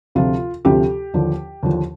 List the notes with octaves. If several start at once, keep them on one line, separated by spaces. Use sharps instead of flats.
D2 C3 F3 F4
D2 C3 F3 G4
D#2 D3 F3
D#2 D3 F3